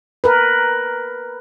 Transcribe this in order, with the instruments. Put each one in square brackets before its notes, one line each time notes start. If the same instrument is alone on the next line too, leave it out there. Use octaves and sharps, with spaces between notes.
[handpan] A#4 B4